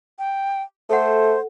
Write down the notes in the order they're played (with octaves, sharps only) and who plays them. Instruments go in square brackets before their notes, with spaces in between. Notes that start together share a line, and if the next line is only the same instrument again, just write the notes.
[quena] G5
[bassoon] A3 [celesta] A4 F#5 [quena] C5